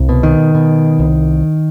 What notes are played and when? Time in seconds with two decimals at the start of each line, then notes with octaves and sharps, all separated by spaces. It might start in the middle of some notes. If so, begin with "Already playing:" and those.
Already playing: C2
0.09 B2
0.23 D#3
0.55 B2
0.99 C2